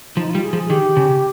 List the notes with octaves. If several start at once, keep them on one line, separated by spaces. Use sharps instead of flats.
F3 D#4
F4
G3
G#4
F3
G#4
D#3 G4
C#3